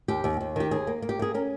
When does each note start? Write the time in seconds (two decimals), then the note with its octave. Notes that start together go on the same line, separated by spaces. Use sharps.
0.08 D#2 G4
0.24 D#2
0.40 D#2
0.56 D#3 G4
0.71 D#2 G#4
0.87 A#3
1.02 A#3
1.09 G4
1.19 A#3 G#4
1.34 C#4 A#4